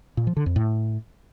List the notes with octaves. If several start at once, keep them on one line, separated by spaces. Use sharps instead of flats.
A#2
F3
D3
F2
A2